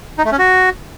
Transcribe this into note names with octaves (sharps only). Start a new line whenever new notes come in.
D#4
A3
C#4
F#4